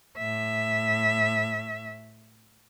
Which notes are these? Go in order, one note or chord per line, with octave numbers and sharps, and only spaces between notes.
A2 E5